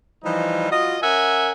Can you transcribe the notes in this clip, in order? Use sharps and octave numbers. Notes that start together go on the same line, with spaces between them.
E3 F3 G3 D#4
F4 F#4 D#5
C#4 A#4 E5 F#5 G#5